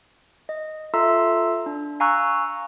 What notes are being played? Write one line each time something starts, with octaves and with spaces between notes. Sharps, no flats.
D#5
F4 A4 E5 A#5 C6 E6
D4
F5 G#5 A#5 C#6 E6 F#6